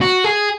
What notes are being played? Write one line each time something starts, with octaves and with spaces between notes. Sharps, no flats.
F#4
G#4